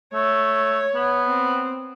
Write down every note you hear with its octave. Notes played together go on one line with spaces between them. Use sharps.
A3 C#5
B3
C4